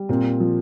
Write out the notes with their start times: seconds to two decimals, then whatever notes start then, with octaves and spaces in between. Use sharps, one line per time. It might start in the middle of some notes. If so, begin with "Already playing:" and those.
Already playing: G3
0.09 A#2 C4
0.40 F3